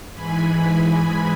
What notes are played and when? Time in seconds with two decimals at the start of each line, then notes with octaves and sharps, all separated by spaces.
0.13 G#2 E3 G#3 G#5 B5